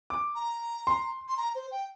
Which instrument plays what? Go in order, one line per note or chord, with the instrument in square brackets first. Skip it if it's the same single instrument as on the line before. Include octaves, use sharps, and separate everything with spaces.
[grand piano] D6
[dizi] A#5
[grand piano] C6
[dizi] C6
A#5
C5
G5